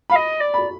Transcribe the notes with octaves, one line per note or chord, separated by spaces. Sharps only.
F5 B5
D#5
D5
B5